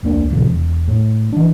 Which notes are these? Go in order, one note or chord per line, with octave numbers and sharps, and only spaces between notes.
E1 C#2 A#3 D4
D#1 A1 F2 C3
E1
A2
E3 D4